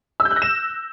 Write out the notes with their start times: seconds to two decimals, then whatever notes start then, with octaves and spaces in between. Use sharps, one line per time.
0.20 E6
0.25 G6
0.31 F#6
0.36 A#6
0.42 E7